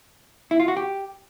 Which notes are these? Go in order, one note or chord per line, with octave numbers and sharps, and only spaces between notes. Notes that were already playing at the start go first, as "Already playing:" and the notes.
E4
F4
F#4
G4